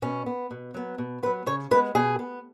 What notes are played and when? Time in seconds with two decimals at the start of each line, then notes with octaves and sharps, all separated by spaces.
0.02 B2 C#4
0.26 B3
0.51 B2
0.74 F#3 B3
0.98 B2
1.23 B3 B4
1.26 F#3
1.46 C#3 C#5
1.71 G#3 B4
1.74 B3
1.95 B2 G#4
2.19 B3